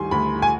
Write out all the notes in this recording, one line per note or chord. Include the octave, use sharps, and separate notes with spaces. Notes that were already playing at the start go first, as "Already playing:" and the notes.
Already playing: D2 D#3 G3 G#5 C6
D2 B5
G#5